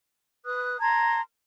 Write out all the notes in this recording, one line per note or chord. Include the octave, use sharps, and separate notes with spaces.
B4 D#6 F#6
A5 A#5 C6 G#6